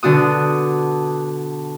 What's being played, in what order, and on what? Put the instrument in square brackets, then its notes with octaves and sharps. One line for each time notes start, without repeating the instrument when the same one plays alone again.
[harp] B2 D3 D4 F#4 D#6